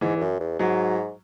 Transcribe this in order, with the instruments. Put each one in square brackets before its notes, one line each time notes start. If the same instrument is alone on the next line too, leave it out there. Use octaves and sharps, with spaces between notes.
[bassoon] G#2 [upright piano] E3
[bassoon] E2
F#2
E2
[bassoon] G#2 [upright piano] F#3